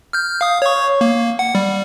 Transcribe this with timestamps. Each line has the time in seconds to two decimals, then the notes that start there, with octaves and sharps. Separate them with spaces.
0.13 F6 G6
0.41 F5 D#6
0.62 C#5 C#6
1.01 A#3
1.39 F#5
1.55 G3